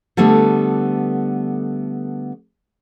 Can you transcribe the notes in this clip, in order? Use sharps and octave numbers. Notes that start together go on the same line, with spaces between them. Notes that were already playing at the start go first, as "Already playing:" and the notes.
D3 G3 A3 B3